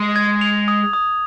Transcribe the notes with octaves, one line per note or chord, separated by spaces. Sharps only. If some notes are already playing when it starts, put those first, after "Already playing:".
Already playing: G#3
G#6
F7
D#6
D#6